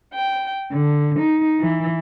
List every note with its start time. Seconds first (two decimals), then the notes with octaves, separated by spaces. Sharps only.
0.15 G5
0.72 D3
1.18 D#4
1.60 E3